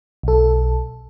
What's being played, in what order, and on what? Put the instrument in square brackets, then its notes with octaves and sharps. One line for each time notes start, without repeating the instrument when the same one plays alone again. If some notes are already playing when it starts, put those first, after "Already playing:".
[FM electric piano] B1 A4